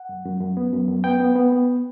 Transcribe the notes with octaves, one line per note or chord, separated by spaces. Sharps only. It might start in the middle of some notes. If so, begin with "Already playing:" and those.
Already playing: F#5
F#2
F#2
F#2
B3
F#2
F#2
B3 G5
B3
B3
B3